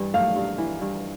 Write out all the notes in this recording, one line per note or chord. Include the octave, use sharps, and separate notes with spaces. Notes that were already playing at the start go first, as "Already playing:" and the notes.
Already playing: G2 E3
A3 F5
G2
E3
G2